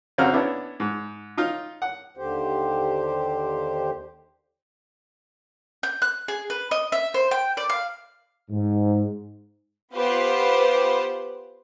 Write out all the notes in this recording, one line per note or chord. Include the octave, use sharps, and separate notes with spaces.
F2 C#3 C4 F#4 A#5 F6
B3 C#4 D4 E4
G#2
D#4 F4
F#5
D#2 D3 G4 C5
G6
F#6
G#4
B4
D#5
E5
C5
G5
D5
F5
G#2
B3 F4 G4 B4 C5